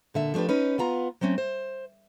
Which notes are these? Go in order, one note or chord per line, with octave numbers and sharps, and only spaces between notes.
A#2 D3 E5
F3 A3 D4 G4 B4
C#4 D#4 B4
B3 F4 A#5
F#3 A3 C4 C#4
C5